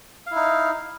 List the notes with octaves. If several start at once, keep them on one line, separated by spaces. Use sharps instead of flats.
D#4 E4 F5